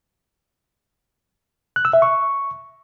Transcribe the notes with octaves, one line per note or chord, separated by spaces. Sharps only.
F#6
E6
E5
C#6